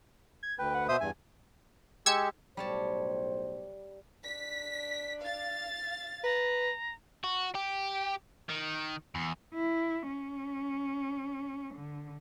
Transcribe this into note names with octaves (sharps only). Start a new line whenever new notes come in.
G#6
D2 B4 G5
F#5
B2 C5 E5 D#6
E2 G2 G#5
G#3 G4 E6 G#6 C#7
B1 A2 G3 C5 C#5 A5
D4 B6
F5 A6
B4 A#5
F#4
G4
D#3
E2
E4
C#4
D3